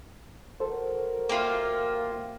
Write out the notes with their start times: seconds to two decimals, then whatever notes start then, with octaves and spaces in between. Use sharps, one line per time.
0.60 F#4 A4 A#4 C5
1.29 A#3 F4 E5 G5 D6